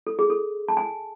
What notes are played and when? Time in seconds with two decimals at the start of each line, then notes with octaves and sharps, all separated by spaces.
0.07 A4
0.19 G#4
0.30 A4
0.68 A5
0.77 G#5